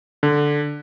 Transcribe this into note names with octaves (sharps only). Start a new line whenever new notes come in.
D3